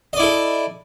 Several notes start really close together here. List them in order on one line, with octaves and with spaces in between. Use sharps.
D#5 D5 E4 A4